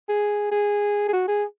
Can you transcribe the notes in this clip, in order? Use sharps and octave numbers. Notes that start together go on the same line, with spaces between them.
G#4
G#4
G#4
F#4
G#4